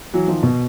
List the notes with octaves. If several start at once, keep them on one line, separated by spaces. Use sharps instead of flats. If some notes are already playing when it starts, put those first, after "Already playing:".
E3 F#3
D#3 F3
B2